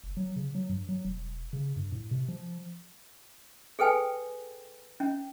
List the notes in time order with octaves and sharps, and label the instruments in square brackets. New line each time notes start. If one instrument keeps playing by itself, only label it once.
[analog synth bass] F#1
F#3
C#3
F#3
G2
F#3
E1
C#3
G2
A2
C3
F3
[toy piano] G#4 A4 B4 G5 G#5
C#4